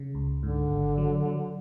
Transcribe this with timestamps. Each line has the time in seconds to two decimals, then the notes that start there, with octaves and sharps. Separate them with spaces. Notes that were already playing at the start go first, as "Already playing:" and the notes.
Already playing: C#3
0.15 C#2
0.43 G#2 D3
0.70 G#1
0.98 F#3
1.25 F#3